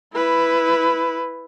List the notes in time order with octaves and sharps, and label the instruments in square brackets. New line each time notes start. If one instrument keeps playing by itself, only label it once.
[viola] E4 B4